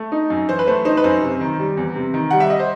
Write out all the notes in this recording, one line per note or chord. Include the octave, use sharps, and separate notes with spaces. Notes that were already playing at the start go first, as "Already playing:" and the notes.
Already playing: A3
D#4
F#2
E3 C5
B4
A3 C5
D#4 C5
B4
F#2 C5
C3
D#3
G3
E2
C3
D#3
G3 F#5
E5
D#5
C5